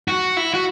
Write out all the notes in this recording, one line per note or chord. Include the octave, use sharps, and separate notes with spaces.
F#4
E4
F#4